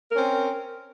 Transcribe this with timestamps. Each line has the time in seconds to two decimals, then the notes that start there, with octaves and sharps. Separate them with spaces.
0.11 A#4
0.14 C#4
0.17 C4